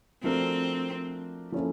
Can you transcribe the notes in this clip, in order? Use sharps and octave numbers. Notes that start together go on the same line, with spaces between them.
F3 A3 C4 D4 F#4 A#4
F3 A#3 C#4 E4 A4